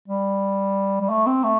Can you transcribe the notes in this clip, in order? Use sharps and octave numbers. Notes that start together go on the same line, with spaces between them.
G3
G3
A3
C4
A3